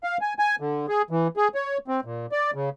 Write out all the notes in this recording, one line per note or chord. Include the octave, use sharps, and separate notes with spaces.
F5
G#5
G#5
D3
G#4
E3
G#4
C#5
C4
A#2
D5
C#3